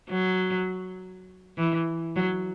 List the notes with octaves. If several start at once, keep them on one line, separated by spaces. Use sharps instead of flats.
F#3
E3
F#3